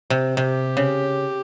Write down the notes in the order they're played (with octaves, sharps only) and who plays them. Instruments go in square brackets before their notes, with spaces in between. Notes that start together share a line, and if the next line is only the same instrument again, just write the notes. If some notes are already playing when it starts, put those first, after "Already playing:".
[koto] C3
[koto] C3 [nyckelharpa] G4
[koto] C#3